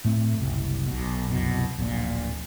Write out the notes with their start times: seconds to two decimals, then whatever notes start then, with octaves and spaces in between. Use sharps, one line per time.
0.05 A2 A3 C4
0.38 F#1 C2
0.87 B1 B2
1.30 C2 F#2 B2
1.78 D1 A#1 A#2